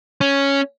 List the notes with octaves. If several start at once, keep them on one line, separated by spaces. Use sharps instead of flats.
C#4